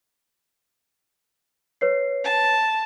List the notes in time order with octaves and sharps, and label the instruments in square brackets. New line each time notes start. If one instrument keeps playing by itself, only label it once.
[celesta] B4 C#5 C7
[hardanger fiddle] A5